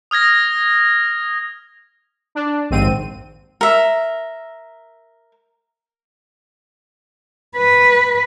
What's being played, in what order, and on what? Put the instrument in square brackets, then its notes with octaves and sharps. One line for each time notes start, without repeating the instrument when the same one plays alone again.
[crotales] D#6 F6 G#6 A#6
[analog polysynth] D4
A#1 D#2 G#2 C4 D#7
[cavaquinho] A#4 E5
[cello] B4